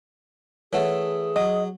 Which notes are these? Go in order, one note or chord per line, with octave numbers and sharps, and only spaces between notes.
E3 A3 G#4 C#5 F#5
F#3 D#5